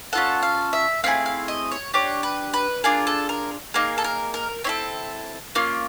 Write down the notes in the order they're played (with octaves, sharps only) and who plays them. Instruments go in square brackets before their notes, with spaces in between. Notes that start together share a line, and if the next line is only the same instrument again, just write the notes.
[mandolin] C#4 F4 A4 F#5
F5
E5
A3 C4 E4 G#4 F5
F5
D#5
C#5
D4 G4 C#5
B4
B4
D4 F4 G#4 A#4
A4
A#4
A#3 D#4 G#4 A#4
A4
A#4
A#4
C4 E4 A4 C#5
A#3 C#4 F4